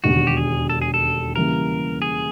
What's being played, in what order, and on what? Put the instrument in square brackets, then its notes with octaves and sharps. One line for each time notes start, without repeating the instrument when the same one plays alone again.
[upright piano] E1 D#2 D3 [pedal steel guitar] F#4
[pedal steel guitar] G4
G#4
A4
G#4
A4
[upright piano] C#3 E3 G3 A#3 [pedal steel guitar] A#4
[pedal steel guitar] G#4